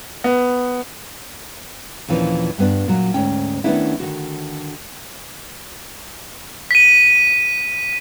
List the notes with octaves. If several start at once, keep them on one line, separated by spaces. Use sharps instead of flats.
B3
D#2 A#2 E3 F3 C#4 D4
G2 B3 D4
A#2 F#3
D2 G#2 C#4 G5
D#3 A3 B3 C#4 D4 E4
D3 D#3 F#4
B6 D#7